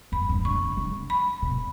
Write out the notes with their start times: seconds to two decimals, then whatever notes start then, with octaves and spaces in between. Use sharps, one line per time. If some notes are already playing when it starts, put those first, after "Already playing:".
0.12 F#2 B5
0.29 G2
0.45 D3 C#6
0.77 D3
1.10 B5
1.42 B2